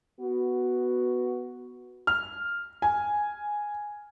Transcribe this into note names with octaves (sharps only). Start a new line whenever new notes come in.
B3 F#4
F6
G#5